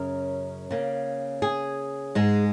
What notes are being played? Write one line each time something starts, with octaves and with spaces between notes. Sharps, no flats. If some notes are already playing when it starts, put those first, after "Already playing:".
Already playing: F#2 C#3 A#4
C#3 A#3
G#4
G#2 G#3